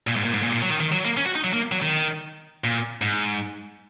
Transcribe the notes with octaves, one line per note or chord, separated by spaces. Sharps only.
A#2
G#2
A#2
G#2
A#2
A#2
F#3
D#3
D#3
F#3
A#3
C#4
F#4
D#4
F#3
A#3
F#3
D#3
A#2
G#2